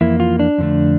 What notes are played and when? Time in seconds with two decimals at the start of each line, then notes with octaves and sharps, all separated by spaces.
0.01 F2 E3 A#3 E4
0.20 F4
0.39 D4
0.58 F2 D3 A3